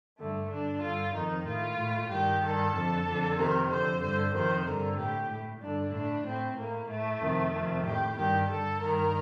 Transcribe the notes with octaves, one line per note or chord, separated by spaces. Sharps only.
G2 D3 A3
G2 D3 D4
G2 D3 F4
F2 D#3 D#4
A2 F4
A2
G2 D#3 G4
G2 D#3 A4
F2 D3
F2 D3
F2 C3 D#3 A#4
F2 D3 C5
G2 D3 C5
F2 C3 D#3 C5
G2 D3 A#4
A2 G4
A2
G2 D3 D4
A2 D4
A2 C4
A2 A#3
A2 A3
F2 C3 D#3
F2 C3 D#3
A2 G4
G2 D#3 G4
G2 D3 A4
G2 D#3 A#4